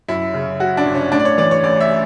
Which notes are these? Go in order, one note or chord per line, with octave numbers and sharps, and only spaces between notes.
F#2 E4
C#3
F#3 F#4
D4
G1
C#4
A2 D4
D5
C#5
E3 D5
C#5
A1 D5
E5